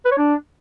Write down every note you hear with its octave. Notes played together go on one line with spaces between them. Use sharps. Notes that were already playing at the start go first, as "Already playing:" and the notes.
B4
C#5
D4